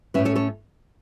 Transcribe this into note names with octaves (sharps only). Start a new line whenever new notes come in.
A2 A3 C#4 B4 E5
A4 C#5
A4 C#5